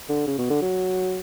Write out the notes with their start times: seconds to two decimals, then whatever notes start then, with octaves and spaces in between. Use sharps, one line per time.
0.09 D3
0.27 C#3
0.38 B2
0.50 D3
0.62 F#3